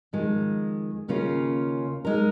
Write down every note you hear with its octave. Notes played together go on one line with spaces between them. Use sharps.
F2 D#3 G#3
D#2 C#3 A#3 C#4 F4
G#3 D#4 A#4